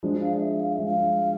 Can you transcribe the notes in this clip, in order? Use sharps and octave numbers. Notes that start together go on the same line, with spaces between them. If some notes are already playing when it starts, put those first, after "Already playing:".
F3 G#3 D4
F5
D5
E5
F5
E5
F3 G#3 D4
F5